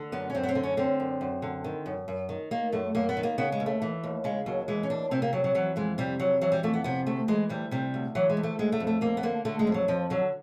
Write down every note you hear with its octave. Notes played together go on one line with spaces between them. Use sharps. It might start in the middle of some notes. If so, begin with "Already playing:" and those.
Already playing: D3
F#2 B3
C#4
F#2 C4
B3
C4
D3
C#4
D3 C4
F#2
F#2
D3
D#3
F#2
F#2
D#3
D#3 A#3
F#2 A3
F#2 A#3
B3
D#3
A#3
C#3 B3
G#3
D#2
A3
E3
D#2
C#3 G#3
D#2 F#3
E3 G#3
C#4
D#2 D4
C3 C4
A#3
F2 F#3
F#3
E3 F#3
F2 G#3
C3 G3
F2 F#3
E3 F#3
G3
F2 A3
B3
C3 B3
D2 A3
E3 G#3
D2 G3
C3 G3
D2
E3 F#3
G#3
D2
A3
D3 G#3
A3
F2
A3
F2 A#3
B3
D3 A#3
D3 A3
G#3
F2
F#3
F2 F3
D3 F#3